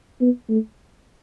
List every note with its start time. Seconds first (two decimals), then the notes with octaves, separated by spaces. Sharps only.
0.21 B3
0.49 A3